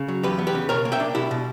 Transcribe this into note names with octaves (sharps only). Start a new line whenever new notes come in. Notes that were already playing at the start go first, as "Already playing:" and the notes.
Already playing: C#3
F#3
E2 G4 B4
B3
G4 B4
C#3
B2 A#4 C#5
A#3
E5 G5
D4
B2 E4 G4
B2